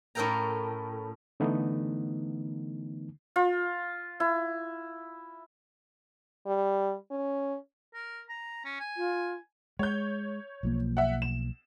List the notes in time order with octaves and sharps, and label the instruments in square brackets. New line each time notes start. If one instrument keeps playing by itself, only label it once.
[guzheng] A2 C#4 A4 A#4 G5 A#5
[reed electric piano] D3 E3 A3 B3 D#4
[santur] F4
E4
[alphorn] G3
C#4
[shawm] A#4
A#5
C#4
G#5
[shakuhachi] F4
[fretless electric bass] G#3 [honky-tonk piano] C#5 G6
[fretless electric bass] B1 F3 A#3
[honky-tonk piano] E5 F#5
E7